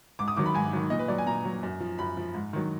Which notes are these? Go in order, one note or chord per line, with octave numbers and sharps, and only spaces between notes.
G#2 D6
D#6
D#3 F#3 D6
B5
G#2 G#5
D#3 F#3
A#2 D#5
B4
F#3 D5
G#5
A#2 A#5
F#3
F#2
F3
F#2 B5
F3
G#2
D#3 F#3